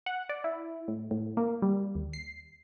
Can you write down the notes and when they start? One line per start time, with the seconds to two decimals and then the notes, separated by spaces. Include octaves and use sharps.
0.06 F#5
0.29 D5
0.44 E4
0.88 A2
1.11 A2
1.37 A#3
1.62 G3
1.95 D#2
2.13 C7